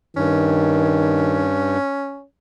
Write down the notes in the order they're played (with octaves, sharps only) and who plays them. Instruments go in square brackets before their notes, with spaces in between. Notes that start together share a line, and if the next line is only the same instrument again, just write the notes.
[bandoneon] G2 [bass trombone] D#3 [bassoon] C#4